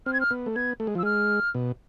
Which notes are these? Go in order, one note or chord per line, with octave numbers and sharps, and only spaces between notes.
C4 F6
G#6
F6
B3
A3
B3 G#6
A3
G#3
F3
E6
G#3 F6
B2